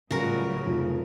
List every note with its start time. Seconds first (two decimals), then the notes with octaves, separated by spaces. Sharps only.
0.11 C#2 A2 C#3 F#3 G3 F4 F#4 A#4
0.65 F1 F3